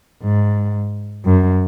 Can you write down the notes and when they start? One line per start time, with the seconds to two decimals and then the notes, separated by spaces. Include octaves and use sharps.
0.22 G#2
1.25 F#2